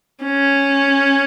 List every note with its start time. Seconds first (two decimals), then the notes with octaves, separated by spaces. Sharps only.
0.25 C#4